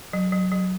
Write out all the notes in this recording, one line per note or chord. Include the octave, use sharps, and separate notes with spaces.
F#3
F#3
F#3